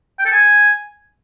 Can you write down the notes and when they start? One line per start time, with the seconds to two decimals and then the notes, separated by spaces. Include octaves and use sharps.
0.19 G5
0.26 A4
0.32 G#5